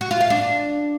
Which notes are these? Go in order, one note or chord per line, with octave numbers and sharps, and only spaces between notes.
F#4
F4
F5
D4